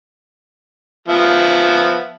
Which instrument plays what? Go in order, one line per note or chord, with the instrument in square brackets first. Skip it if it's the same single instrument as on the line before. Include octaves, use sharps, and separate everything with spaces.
[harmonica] F3 B3 E5